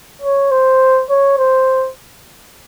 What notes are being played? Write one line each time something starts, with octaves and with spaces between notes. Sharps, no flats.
C#5
C5
C#5
C5